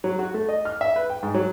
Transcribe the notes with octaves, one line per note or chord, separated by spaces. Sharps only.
F#3
F#4
A3
D#5
F6
E5
B4
G5
G#2
F#3